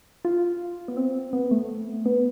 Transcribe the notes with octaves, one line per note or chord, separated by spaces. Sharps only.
F4
B3
C4
B3
A3
B3